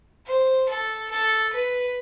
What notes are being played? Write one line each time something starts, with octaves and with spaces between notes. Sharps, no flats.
C5
A4
A4
B4